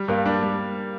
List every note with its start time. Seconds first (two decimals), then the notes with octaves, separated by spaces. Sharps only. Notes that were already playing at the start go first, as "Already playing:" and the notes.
Already playing: G3
0.08 G2 A#3
0.26 G3 D4
0.43 G3